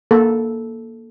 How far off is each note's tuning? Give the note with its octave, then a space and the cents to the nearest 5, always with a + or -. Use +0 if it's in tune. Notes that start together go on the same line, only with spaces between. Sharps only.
A#3 +0 A4 -5